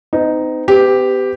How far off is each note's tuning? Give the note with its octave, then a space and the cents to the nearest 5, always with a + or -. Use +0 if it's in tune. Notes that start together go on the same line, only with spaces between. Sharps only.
C4 -45 D#4 +0
B3 +40 G4 +0